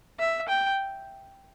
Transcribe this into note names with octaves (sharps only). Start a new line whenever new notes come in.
E5
G5